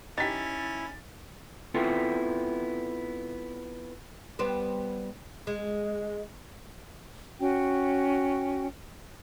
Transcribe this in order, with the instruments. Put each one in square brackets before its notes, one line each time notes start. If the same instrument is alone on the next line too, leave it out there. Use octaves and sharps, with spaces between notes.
[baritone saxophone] C#4 [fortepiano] D#4 G4 [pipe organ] E4 [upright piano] A6 B6
[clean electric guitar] B3 C4 E4 F4 A4
[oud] G3 B3 C5
G#3
[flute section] C#4 F#4 G5